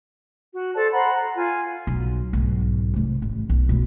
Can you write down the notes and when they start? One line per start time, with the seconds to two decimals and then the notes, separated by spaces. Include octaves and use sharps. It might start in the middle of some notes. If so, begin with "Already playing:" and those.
0.54 F#4
0.74 A4 C5 D5 A5
0.92 C5 F#5 A#5 B5
1.15 A#5
1.36 F4 G#5
1.87 B1
2.33 B1 G#2
2.94 C3 G#3
3.22 A1
3.49 B1
3.69 B2 G#3